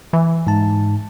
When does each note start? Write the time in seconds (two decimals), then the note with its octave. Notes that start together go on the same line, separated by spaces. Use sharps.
0.13 E3
0.47 G#2 A5